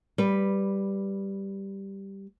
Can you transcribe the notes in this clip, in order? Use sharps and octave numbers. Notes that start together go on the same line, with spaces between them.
G3 B4